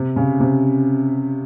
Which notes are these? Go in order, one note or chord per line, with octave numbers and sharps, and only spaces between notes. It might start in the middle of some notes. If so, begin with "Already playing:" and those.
Already playing: C3
C#3
C3